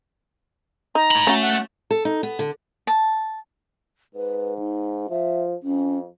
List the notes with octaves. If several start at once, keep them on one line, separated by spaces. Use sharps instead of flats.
D#4 A#5
A2 B5
A3 C#4 F#4
F#5
A4
D#4
B3
D3
A5
G#2 B4
D#4
F3 E5
F2 C#4